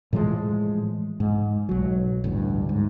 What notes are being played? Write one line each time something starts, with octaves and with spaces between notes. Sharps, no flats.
A2 E3 F3 G#3
G#2
B1 F#3
A1 D2 G2
G#2